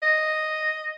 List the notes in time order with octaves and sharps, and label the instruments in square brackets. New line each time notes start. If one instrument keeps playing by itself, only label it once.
[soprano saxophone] D#5